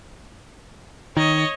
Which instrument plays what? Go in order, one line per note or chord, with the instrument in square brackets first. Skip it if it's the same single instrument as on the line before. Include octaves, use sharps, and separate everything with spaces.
[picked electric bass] D#3 [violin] C#5 D#5